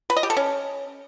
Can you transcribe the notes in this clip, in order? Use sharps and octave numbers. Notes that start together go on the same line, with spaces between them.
B4
D#5
G4
A4
C#4